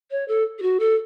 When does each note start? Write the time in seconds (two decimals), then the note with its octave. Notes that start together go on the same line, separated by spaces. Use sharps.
0.11 C#5
0.28 A4
0.59 G#4
0.62 F#4
0.80 A4